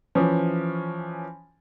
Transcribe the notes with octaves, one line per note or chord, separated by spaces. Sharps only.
E3 F3 C#4